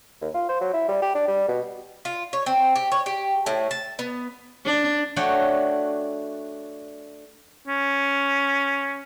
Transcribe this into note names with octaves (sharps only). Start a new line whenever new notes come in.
D#2
F4
C5
F#3
E4
G3
G4
D4
G3
B2
F4
C#5
C4
G4
C#5
G4
A2
A5
B3
D4
A3 D4 F#4 C#5 F#5 G5
C#4